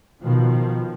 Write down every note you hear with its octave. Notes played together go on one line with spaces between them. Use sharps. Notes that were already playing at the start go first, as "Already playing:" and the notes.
B2 D#3 F3